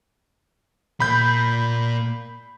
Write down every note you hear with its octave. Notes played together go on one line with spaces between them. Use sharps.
A#2 A#3 B5 G6